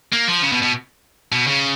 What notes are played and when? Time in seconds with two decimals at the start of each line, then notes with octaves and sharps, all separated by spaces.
0.13 A#3
0.28 F3
0.43 C#3
0.52 B2
0.62 B2
1.32 B2
1.47 C#3